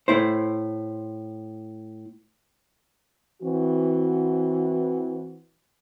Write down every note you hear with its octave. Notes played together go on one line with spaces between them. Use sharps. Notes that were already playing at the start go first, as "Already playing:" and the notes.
A2 E4 C5
E3 C4 F#4